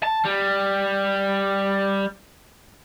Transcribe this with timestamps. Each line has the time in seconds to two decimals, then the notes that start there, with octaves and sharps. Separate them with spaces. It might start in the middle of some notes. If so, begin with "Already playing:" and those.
0.04 A5
0.25 G3